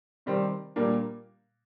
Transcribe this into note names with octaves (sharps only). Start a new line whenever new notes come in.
C3 D#3 G3 C4
A#2 G3 A#3 D4